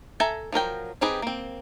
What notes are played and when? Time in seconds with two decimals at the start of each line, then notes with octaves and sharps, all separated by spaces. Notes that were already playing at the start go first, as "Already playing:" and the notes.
0.20 A4 E5 G#5 A#5
0.53 F3 F#3 A#4 G5
1.01 C4 D#4 G4 G#4 B4
1.22 A#3 C4